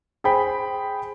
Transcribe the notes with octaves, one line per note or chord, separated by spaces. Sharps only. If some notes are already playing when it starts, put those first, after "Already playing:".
G#4 C5 G5 B5